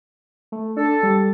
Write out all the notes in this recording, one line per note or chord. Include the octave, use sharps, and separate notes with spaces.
A3
D4 A4
G3